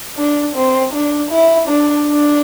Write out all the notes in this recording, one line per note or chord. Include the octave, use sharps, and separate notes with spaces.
D4
C4
D4
E4
D4
D4